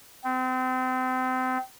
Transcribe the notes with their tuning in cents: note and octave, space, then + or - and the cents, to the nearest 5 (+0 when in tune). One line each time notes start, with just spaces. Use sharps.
C4 -30